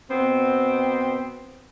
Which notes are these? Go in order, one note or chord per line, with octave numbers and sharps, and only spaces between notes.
B2 B3 C4